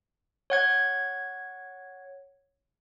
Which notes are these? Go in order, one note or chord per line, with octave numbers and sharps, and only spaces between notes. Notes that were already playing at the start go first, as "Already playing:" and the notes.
C#5 F#5 G#6